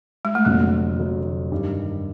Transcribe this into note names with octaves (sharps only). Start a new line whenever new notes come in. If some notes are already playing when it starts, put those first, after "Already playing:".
G#3
A3
F1 F2 D3 F#3 A#3
F1 F2 D3 F#3
G2 D#3 G3